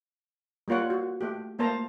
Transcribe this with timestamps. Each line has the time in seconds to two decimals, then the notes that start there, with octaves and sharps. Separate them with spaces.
0.68 G3 A#3 F4 C#5 F#5
0.90 F#4
1.21 A3 G4
1.59 A3 A#3 C5 A5 A#5